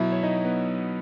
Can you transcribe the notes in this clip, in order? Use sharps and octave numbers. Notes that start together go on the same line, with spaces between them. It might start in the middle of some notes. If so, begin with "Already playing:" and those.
Already playing: B2 F#3 E4 E5
C#5
D#4 D#5
B3 B4